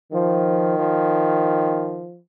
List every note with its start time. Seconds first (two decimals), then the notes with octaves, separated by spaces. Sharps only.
0.12 D#3 F3
0.79 F3